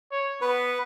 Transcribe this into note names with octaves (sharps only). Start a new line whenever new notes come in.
C#5
B3 B4